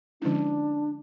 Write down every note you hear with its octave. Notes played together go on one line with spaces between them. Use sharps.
D3 F3 G#3 C#4 D4 E4